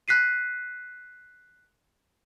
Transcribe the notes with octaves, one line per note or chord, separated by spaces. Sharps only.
F#6 B6 C7 D#7